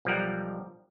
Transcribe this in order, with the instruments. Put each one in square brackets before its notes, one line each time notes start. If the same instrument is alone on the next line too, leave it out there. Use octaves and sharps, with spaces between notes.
[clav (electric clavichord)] B1 F3 G3 A#4 F#5